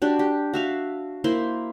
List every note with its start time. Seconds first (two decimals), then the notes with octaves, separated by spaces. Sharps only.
0.02 D4 F#4 G4
0.19 G4
0.53 F#4 E5 F5
1.24 A#3 E4 C5 C6